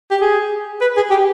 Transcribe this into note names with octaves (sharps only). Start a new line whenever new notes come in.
G4
G#4
B4
G#4
G4